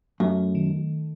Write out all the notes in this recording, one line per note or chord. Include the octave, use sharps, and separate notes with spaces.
F#2 A3
D#3